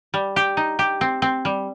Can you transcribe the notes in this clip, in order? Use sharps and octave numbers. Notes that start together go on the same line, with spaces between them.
G3
G4
D#4
G4
C4
C4
G3